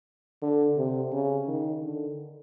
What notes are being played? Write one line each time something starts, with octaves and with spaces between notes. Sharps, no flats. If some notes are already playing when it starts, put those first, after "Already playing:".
D3
C3
C#3
D#3
D3